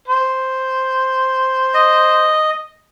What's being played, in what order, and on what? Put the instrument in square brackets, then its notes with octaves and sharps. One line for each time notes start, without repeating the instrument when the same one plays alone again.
[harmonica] C5
[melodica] D#5